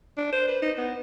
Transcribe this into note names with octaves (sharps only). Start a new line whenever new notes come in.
D4
C5
B4
D#4
B3